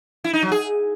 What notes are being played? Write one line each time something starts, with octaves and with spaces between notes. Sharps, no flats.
E4
D#4
F#3
G#4